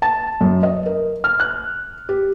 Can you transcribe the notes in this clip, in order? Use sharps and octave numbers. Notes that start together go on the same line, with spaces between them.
A5
F#2
D#5
A#4
F6
F#6
G4